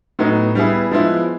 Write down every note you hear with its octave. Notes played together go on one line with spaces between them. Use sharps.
A2 F#3 B3 D#4
G3 B3 E4 G#4
F3 G#3 B3 E4